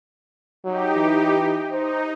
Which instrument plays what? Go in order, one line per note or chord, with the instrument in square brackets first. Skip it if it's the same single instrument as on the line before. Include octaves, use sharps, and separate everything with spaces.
[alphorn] F#3 [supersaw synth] D#4 G4
[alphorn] E3
[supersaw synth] D#4 [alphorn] C5